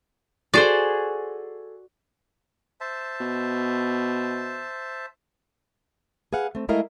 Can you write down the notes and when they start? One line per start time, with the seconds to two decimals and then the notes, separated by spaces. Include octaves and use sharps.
0.54 F#4 G#4 A4 C5 D5
2.81 C5 E5 A5
3.20 B2
6.33 G#4 B4 F5 F#5
6.55 A3 C4
6.69 G#3 A3 E4 A#4 D#5 F5